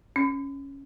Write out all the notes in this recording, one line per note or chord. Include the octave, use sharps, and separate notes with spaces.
C#4